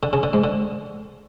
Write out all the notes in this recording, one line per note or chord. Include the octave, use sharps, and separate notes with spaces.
D3
C#3
D3
G#2
D3